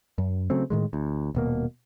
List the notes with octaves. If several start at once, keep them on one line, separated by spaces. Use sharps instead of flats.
F#2
C#3 F#3 A3 C4
A2 D#3 G#3
D2
D#1 B2 A#3